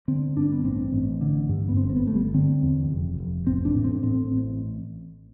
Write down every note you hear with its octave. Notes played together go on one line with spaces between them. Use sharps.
D3 C4
G2 D4
B3
A1 C4
A1
D3
G2
B3
G1 C4
C4
B3
G1 A3
G3
D3 C4
E2
F1
F1
A1 C4
D4
A2
C4
A2 C4
A1